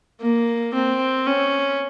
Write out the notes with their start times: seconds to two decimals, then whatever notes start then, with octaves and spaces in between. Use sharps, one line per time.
0.21 A#3
0.74 C4
1.27 C#4